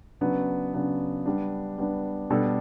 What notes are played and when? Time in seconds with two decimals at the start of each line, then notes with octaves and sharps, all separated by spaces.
0.21 C#3 F#3 B3 D4
0.74 C#3 F#3 B3 D4
1.26 G3 B3 D4
1.78 G3 B3 D4
2.30 B2 G3 D4 A4